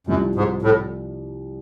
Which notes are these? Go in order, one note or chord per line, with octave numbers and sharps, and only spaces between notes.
C2 F#2 C3 F3
G#2
A2